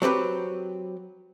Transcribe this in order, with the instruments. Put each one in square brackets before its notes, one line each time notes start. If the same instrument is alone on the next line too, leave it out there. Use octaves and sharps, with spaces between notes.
[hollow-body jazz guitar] F#3 C4 G4 B4